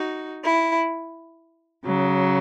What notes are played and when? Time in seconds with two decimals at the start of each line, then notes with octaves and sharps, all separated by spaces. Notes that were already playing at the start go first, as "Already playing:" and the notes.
Already playing: D#4 F#4
0.44 E4
1.85 C#3 F#3